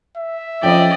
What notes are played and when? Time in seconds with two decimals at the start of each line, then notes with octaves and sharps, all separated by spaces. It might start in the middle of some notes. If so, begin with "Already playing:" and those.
0.17 E5
0.63 F2 C#4 D5 D#5 G5